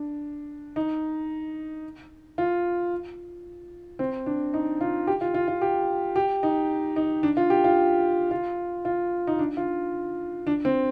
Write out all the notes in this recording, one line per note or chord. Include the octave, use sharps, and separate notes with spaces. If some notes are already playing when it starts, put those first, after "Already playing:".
Already playing: D4
D#4
F4
C4
D4
D#4
F4
G4
F4
F4
F4
G4
G4
D#4
D#4
D4
F4
G4
F4
F4
F4
D#4
D4
F4
D4
C4